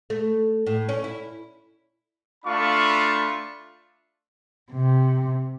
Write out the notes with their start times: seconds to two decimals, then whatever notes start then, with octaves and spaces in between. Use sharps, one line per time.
0.10 A3
0.66 A2
0.89 C#4
1.04 E4
2.45 A3 D4 F4 F5 B5 C#6
4.72 C3